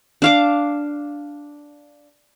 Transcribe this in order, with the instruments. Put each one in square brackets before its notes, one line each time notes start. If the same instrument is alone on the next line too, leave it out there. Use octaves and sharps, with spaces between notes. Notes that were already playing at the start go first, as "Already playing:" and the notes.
[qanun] D4 F5 D6